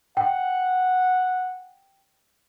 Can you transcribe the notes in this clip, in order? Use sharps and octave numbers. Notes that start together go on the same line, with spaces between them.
F#5 G5